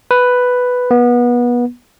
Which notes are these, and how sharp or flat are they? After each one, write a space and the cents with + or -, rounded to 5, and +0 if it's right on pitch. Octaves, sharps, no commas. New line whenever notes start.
B4 +5
B3 -25